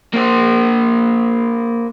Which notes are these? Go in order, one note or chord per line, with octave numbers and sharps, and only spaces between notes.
A#3 C5